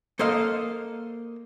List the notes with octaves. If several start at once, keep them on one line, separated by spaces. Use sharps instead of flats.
A#3 A4 C5 D#5 F5